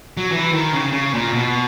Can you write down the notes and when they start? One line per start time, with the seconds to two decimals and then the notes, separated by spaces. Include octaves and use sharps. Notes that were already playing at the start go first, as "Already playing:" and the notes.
0.17 F#3
0.32 E3
0.53 D#3
0.72 C#3
0.92 C#3
1.13 A#2
1.33 B2